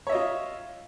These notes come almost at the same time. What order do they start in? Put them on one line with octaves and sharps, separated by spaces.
C#5 E5 D#5 F4